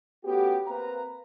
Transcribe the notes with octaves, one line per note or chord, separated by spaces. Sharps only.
A3 B3 C#4 F#4 G4
A#3 C4 B4 F5 A#5